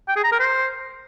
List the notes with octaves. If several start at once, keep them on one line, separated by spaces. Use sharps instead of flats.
G5
G#4
A#5
A#4
C5